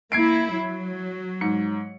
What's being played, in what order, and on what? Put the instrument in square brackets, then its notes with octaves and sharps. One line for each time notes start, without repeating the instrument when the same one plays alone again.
[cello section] A#3 E4 [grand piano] G#6 C7 D7
[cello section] F#3
[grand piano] G#2 C#7